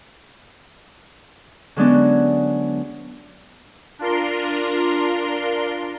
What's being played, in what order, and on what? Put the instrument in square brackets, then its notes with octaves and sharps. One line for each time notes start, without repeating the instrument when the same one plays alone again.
[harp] D3 F#3 G#3 B3 C#4 D4
[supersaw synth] D4 F4 A#4 C6